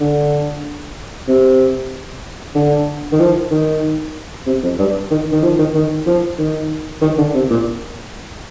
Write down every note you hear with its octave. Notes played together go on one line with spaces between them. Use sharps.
D3
C3
D3
D#3
F3
D#3
C3
F2
G2
D#3
D#3
F3
D#3
D#3
F3
D#3
D#3
D3
C3
A#2